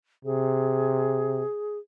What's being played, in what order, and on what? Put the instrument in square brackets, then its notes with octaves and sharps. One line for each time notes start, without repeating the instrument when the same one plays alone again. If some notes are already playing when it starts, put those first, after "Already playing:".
[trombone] C3 [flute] G#4